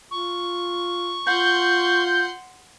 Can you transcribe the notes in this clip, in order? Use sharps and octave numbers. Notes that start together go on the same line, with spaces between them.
F4 C#6
F4 F#5 C6 G6